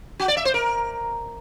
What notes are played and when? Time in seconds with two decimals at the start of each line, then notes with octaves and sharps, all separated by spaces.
0.20 F#4
0.28 D5
0.37 E5
0.45 C5
0.54 A#4